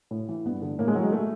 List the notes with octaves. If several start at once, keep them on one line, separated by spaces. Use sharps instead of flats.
A2
E3
G2 B3
D3
A2 A#3
G#3
E3 F#3
G#3
A3